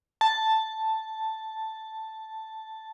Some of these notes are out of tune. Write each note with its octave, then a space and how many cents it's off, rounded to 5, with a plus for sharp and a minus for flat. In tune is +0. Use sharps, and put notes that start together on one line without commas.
A5 +0